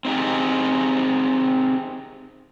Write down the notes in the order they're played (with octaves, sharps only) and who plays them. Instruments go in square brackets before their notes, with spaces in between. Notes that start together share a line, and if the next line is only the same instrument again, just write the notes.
[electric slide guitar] C4 D#4 G4 G#4